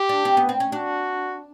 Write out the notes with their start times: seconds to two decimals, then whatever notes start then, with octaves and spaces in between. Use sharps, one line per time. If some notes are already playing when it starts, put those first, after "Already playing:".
Already playing: G4
0.09 D4
0.25 C4
0.37 B3
0.49 C4
0.60 C#4
0.72 D4 F#4